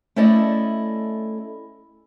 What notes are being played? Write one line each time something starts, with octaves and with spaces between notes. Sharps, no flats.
A3 C#4 E4 A4 D5 D#5